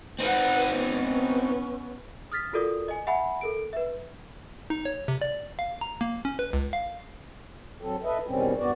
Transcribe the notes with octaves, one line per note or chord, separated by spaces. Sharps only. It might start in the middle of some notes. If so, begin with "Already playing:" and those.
C4 D#4 B4 F#5
B3 C#4
D#6 F6 A6 B6
F4 F#4 A4 A#4 D5 D#6
D#5 G#5
E5 F#5 G#5 B5
A4 A#4 D7
B4 E5
D#4
C#5
C3
D5
F5
A#5
A#3
C#4
B4
C#2
F5
F#3 C4 A4
A4 B4 D#5 E5
E2 B2 D#3 G3 C4 C#4
G2 B3 F#4 D5